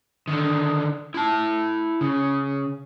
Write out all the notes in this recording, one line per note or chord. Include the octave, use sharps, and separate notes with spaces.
D3 D#3
E4 A5
C#3